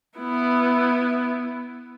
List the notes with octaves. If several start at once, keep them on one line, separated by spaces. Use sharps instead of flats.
B3 E4